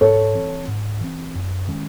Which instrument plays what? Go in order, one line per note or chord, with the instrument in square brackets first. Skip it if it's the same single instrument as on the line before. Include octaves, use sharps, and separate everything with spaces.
[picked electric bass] G#2 [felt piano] A4 C#5
[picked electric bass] E3 C4
G#2
E3 C4
F#2
D#3 G#3 C#4